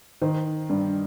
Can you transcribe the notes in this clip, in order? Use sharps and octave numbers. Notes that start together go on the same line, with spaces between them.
D#3 C5
G2